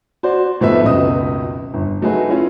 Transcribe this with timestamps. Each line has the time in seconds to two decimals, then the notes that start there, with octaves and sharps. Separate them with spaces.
0.23 F#4 C5 D5
0.61 G#1 F3 A3 B3 B4 E5
0.83 G#1 C#2 F#2 B2 D#5 D#6
1.74 G1
2.02 F#3 A3 D#4 F#4 G#4 B4
2.28 C#4 E4 F4